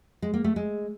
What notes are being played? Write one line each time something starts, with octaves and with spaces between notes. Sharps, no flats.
G#3
A#3
A3
G#3